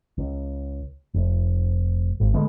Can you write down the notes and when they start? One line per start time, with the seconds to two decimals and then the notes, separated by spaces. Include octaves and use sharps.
0.18 C#2
1.14 F1
2.20 G#1
2.34 D3 G#3 A3 B3